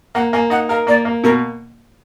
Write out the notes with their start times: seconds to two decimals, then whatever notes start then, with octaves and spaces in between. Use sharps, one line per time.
0.14 A#3 F#5
0.33 A#3 G#5
0.50 D#4 F#5
0.69 A#4 F5
0.87 A#3 D5
1.05 A#3
1.24 B2 A#4